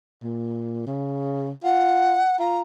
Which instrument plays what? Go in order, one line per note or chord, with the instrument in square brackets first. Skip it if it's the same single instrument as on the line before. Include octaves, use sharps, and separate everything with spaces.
[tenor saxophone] A#2
C#3
[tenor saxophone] F4 [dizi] F#5
[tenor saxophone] F4 [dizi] A#5